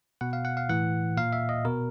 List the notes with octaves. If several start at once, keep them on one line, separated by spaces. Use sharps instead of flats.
B2 F#5
F5
F#5
F5
A2 E3 F#5
A#2 F5
E5
D#5
B2 A#4